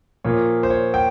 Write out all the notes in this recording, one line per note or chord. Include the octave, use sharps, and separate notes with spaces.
A#2 F3 A#3 C#5
C5
C#5
G5